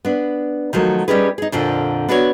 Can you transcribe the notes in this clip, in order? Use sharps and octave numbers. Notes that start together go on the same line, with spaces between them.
B3 D4
D#3 F3 F#3 A3
G3 C#4 D#4 G4 G#4 B4
D#4 G#4
F2 A#2 D3 F3
B3 D4 F#4 A4 C#5